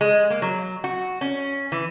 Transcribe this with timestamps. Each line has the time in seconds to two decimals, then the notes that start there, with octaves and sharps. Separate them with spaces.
0.01 G#3
0.30 A#3
0.42 F#3
0.84 F#4
1.21 C#4
1.72 E3